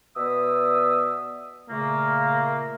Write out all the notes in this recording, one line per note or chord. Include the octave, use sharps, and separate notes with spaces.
B2 B3 D5 E5 D#6 E6
A#2 C#3 A3 A#3